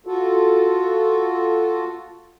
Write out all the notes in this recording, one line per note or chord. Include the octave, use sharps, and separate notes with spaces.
F4 F#4 A4